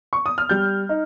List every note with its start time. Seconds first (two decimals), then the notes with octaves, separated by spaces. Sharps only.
0.13 C#6
0.26 D#6
0.38 F6
0.49 G3 G6
0.89 D#4